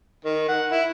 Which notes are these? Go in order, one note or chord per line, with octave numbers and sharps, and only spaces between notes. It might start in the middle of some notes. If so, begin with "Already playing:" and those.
D#3
F#5
E4